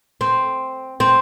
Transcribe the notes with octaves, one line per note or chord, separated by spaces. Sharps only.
C4
C4